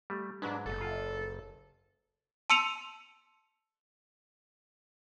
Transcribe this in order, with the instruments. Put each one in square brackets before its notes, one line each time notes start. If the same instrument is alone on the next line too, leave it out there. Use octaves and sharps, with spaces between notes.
[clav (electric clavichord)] G3 A3
[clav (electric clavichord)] G#2 F#3 G#3 [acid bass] D4 [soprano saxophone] B4
[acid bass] F#1 [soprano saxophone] A4
[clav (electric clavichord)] F4
[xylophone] A5 C6 E6 C#7 D#7 F7